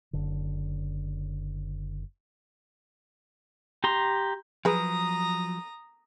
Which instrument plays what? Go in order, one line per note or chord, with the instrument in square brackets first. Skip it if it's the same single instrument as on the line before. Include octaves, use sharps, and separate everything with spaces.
[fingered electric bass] F#1 D3
[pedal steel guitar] G4 A#5 C6
[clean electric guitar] F3 F#3 [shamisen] G#4 B4 [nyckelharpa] A#5 D#6